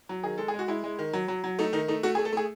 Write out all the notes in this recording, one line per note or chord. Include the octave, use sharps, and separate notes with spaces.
F#3
D#3 G#4
G#3 A4
G#4
G#3
F#4
G#3 E4
G#3
D#3
F#3
F#3
F#3
A3 D#4
D#3 D#4
A3 D#4
A3 F#4
G#4
A3
A4
A3 G#4